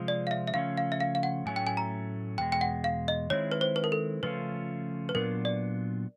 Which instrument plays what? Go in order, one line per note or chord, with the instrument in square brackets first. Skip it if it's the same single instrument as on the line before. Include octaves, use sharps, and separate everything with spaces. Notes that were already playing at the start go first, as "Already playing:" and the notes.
Already playing: [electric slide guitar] C3 F3 G#3 C4 F4
[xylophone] D5
F5
E5
E5
[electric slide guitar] C#3 F3 A3 C#4 [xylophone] F5
[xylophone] F5
E5
F5
F5
F#5
[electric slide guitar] A2 F#3 A3 C#4 [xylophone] G#5
[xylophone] G5
G#5
A#5
[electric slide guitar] E2 B2 G#3 [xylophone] G5
[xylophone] G5
F#5
F5
D#5
[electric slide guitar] D#3 G#3 C4 E4 [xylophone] C#5
[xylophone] B4
C5
B4
A#4
A4
[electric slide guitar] C#3 F3 A3 C#4 F4 [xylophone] B4
[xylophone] B4
[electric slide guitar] A#2 F#3 B3 D4 F4 [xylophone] A#4
[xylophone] D5